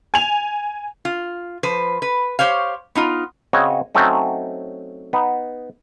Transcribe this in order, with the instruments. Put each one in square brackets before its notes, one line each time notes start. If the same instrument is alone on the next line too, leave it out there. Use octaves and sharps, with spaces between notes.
[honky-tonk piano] G#5 F7
[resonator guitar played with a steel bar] F4
F3 B4 C5
B4
G4 C5 C#5 F5
B3 D#4 F4
[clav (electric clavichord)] C#3 C4 F#4 C#5 D#5
F#3 A3 C4 C#4 D#4
B3 D#4